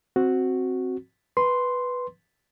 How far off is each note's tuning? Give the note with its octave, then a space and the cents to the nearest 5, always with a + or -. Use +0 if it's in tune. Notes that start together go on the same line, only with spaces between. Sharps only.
C4 +0 F#4 +0
B4 +0 C6 +0